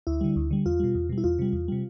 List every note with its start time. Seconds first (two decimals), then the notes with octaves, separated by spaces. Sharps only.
0.07 D2 E4
0.21 D3 G3
0.36 D2
0.51 D3 G3
0.66 E2 F4
0.80 B2 G3
0.95 E2
1.09 B2 G3
1.18 E4
1.24 E2 F4
1.39 C3 G3
1.53 E2
1.68 C3 G3